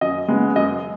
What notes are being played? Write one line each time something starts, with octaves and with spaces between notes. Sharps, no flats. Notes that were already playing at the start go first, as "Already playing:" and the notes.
F#2 D#5
C#3 G#3 B3
F#2 D#5